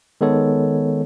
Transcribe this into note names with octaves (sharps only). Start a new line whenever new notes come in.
D#3 G#3 B3 A4 C#5